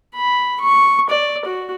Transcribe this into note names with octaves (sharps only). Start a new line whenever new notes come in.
B5
C#6
D5
F#4